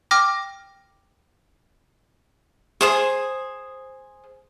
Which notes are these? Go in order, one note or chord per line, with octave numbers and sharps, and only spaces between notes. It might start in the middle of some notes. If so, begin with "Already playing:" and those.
G5 D6 F6 A#6
G#4 C5 D#6